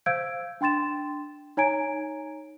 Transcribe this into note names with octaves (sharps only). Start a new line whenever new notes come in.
C5 F5 E6 G6 G#6 D7
D4 G5 C6 A6 E7
D#4 C#5 G#5 A#5 G#6 D7